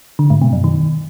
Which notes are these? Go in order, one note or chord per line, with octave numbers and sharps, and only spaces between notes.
D3
G#2
B2
F#2
D#3